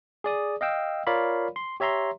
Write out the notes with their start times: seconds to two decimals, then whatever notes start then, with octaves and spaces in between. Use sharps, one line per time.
0.24 G#4 D5 D#6
0.61 D#5 F5 G5 E6
1.07 F4 A#4 C#5 D5 F5 B5
1.56 C6
1.80 G4 C#5 E5 A#5 C6